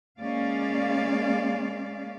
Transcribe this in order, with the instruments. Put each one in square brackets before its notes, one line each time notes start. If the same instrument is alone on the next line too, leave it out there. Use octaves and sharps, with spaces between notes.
[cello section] G#3 A#3 C#4 D5 F5